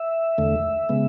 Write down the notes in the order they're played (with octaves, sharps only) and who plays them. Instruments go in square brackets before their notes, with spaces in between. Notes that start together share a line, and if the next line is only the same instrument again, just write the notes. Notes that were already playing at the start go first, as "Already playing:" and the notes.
Already playing: [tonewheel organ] E5
E2 D3 A3
C#3 G#3 B3